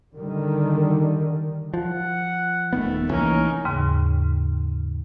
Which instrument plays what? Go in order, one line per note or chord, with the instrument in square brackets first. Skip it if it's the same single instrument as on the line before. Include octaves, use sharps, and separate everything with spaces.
[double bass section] D3 D#3 G3
[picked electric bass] F3 [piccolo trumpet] F#5
[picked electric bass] D#1 D#3 B3 [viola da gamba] A3
[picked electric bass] C2 E3 A#3 [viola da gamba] C#4 D#4 [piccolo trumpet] A#4
[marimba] D#2 G#2 C#3